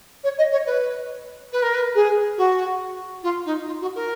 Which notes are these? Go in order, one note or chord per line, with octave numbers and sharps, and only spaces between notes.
C#5
D#5
C#5
B4
B4
A#4
B4
G#4
F#4
F4
D#4
F4
F#4
A#4